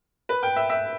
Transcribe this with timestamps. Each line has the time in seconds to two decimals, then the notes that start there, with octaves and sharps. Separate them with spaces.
0.29 B4
0.43 G5
0.56 E5
0.70 E5